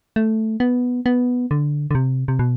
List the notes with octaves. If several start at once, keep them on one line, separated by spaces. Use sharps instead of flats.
A3
B3
B3
D3
D3
C3
C3
B2